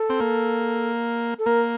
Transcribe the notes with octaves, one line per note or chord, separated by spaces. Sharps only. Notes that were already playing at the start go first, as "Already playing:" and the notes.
Already playing: A4
C4
A#3
A4
A#3 A#4